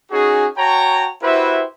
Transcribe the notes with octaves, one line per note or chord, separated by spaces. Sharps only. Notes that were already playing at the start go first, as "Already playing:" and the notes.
C#4 D#4 F#4 G#4
F#4 C#5 G5 A5 A#5
E4 F#4 G4 B4 C5 E5